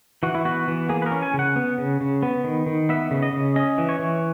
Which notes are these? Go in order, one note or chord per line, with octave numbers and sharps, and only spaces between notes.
E3 F#4
E4
B3 F#4
E3
A#3 G#4
B4
A#4
C#4
G#5
C#3
F#5
B3
C#3
C#3
B3
D#3
D#3
B3 E5
C#3
D#5
C#3
C#4 D#5
E3
C#5
E3